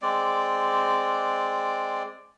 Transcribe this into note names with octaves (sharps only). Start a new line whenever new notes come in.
G#3 C4 D5